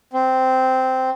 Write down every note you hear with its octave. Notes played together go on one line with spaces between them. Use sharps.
C4